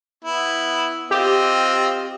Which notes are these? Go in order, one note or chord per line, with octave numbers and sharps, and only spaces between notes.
B3 E4
C4 F4 G4 D#5